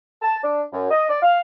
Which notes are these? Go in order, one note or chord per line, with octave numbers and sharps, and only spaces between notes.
A5
D4
F#2
D#5
D5
F5